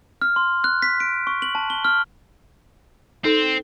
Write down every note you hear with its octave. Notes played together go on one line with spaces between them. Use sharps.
F6
C6
F#6
B6
D7
C#6
F#7
A5
G7
F6
C4 D#4 A4